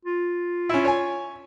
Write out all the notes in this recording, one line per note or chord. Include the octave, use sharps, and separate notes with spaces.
F4
C#4 E4
C#5 G#5